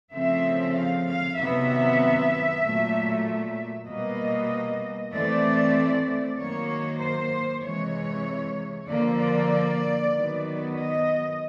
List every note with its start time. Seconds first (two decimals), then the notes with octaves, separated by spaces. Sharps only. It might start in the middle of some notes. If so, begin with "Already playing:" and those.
0.12 C#3 F3 A3 C4 E5
0.75 F5
1.06 F5
1.37 C3 D#3 F#3 B3 E5
2.63 A#2 F#3 A3
3.87 B2 G3 A#3 D#5
5.13 E3 A3 C4 D5
6.37 D#3 F#3 A#3 C#5
7.00 C5
7.63 C3 E3 G#3 C#5
8.88 D3 F3 A#3 D5
9.20 D5
10.14 D#3 F#3 B3
10.76 D#5